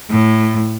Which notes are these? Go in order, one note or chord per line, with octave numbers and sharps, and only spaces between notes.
A2